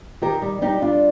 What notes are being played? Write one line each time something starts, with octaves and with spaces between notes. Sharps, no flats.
D#3 G4 A#4
G3
G3 D#4 G4
G3 D4 F4